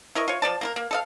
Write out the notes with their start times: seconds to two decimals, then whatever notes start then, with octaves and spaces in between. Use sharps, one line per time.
0.15 E4 A#4 D#5 C#6
0.28 F4 C#5
0.42 F3 B3 D5 A5
0.61 A#3 F#4 A#4
0.76 A#3
0.91 A4 D#5 F5